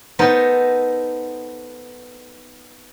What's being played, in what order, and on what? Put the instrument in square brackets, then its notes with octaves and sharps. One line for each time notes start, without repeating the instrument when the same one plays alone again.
[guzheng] B3 D#4 A4 A#4 C5